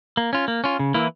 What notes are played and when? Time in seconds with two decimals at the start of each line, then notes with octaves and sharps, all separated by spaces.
0.17 A#3
0.33 C#4 F4
0.48 A#3
0.64 C#4 F4
0.79 C#3
0.94 E3 A#3 E4